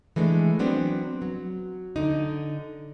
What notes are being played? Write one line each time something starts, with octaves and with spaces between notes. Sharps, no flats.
E3 G#3 A3 D4
F#3 B3 C4 D4
F#3
D3 D#4